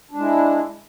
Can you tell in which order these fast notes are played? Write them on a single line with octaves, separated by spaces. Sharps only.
D4 G#3 E4